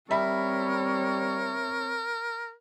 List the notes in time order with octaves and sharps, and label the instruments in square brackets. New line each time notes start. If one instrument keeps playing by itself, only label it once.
[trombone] G3 [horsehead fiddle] C4 C#5 [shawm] A#4 [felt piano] E5 B5